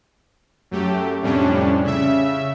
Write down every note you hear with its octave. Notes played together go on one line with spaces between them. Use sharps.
F#2 A3 G4
F2 A2 C3 G3 C#4 D4
C#3 E5